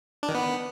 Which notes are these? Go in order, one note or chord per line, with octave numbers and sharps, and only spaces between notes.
D4
D#3
B3